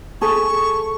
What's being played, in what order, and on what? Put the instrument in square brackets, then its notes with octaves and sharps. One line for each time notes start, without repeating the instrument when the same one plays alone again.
[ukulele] G#4 A4 [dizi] C#6